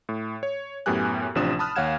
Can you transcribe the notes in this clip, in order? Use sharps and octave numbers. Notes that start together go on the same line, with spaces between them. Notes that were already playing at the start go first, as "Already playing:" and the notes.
A2
C#5
F#2 A2 B3 G4 G#5 F#6
A1 C3 F3 D4 D#6 E7
A5 B5 D#6 F6 F#6
D#2 C#5 F5 F#5 G#6 E7